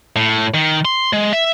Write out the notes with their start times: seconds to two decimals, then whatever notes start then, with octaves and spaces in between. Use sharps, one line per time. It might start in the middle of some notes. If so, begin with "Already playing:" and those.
0.16 A2
0.54 D#3
0.85 C6
1.13 G#3
1.33 E5